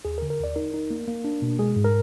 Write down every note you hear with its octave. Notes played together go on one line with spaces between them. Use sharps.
D#2 G#4
A#4
D3
A#4
D#2 D5
D#4 A#4
D#4
A#3
A#3
D4
B2
G#3 G#4
G#2
A#4